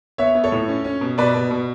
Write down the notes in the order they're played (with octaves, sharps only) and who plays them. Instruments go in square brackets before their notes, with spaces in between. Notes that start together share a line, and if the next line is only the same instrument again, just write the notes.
[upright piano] B3 C#5 E5
B3
A4 C#5
A2
C#4
C#4
B2
B2 B4 D5
B2
B2